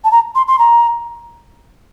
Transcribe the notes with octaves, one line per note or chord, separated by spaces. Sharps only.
A5
A#5
C6
C6
A#5